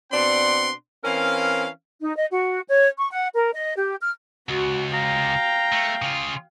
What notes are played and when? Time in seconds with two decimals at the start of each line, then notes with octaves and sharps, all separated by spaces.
0.11 B2 C4 D4 D5 F#5 C6
1.04 E3 C4 C#4 A#4 F5
2.00 D#4
2.16 D#5
2.30 F#4
2.68 C#5
2.98 C#6
3.10 F#5
3.34 A#4
3.53 D#5
3.77 G4
4.01 F6
4.49 C#2 F#4
4.94 F5 G5 A#5
5.72 A3
6.02 C#3 F4